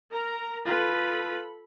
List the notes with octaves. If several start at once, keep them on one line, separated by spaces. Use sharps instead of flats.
A#4 A#5
F4 A4 B4 B5